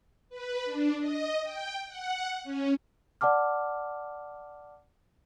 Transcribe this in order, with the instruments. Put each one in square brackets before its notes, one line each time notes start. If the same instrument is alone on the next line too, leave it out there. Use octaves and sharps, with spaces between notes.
[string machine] B4
D4
D#5
G5
F#5
C#4
[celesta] D5 F#5 A5 D6 F6